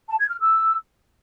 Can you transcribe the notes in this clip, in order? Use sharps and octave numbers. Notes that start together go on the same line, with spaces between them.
A5
G#6
F6
E6